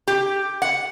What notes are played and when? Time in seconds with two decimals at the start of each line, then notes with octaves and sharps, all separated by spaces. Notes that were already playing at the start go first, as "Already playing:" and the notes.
0.07 G4
0.62 F#5